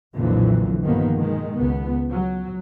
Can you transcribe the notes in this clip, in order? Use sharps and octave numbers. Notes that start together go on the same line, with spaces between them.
B1 F2 A#2 D3 E3 F#3
G2 D#3 F3 A#3 B3
B2 D#3 G#3
C#2 B3
F#3